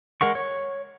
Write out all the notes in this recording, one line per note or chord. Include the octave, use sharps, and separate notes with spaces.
G#3 A#4 F#5 C#6
C#5